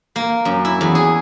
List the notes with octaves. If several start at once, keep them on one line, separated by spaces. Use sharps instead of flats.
A#3
F#2
E4
E2
G#4